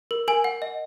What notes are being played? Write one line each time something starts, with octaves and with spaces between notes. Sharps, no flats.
A#4
A#4 G#5
F#5
D#5